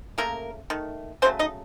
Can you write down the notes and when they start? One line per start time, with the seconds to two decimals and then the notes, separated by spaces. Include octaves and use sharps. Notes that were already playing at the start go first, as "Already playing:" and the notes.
0.18 C#3 A3 A#3 A#4
0.70 D#3 A3
1.22 C#3 F#3 A3 C4 C5
1.39 D#4 D#5